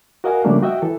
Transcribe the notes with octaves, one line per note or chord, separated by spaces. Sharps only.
F#4 A#4 D#5 F5 F#5 G#5
C#3 F3 G3 A3 A#3 D4
F#4 D#5 E5 G5
E3 A4